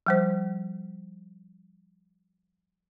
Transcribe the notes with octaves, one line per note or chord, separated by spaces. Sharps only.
F3 G3 C5